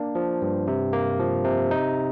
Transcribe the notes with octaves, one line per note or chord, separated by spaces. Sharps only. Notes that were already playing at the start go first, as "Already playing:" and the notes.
Already playing: A#3 D4
F3
G2
C3
A#3
F3
C3
D#4